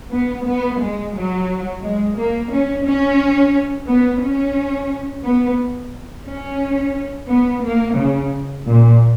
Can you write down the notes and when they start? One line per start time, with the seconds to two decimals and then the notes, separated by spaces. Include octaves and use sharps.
0.12 B3
0.47 B3
0.81 G#3
1.16 F#3
1.83 G#3
2.17 A#3
2.51 C#4
2.86 C#4
3.88 B3
4.22 C#4
5.25 B3
6.27 C#4
7.29 B3
7.63 A#3
7.97 C#3
8.66 A#2